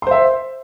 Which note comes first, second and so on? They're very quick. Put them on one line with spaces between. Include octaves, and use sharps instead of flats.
C6 C5 E5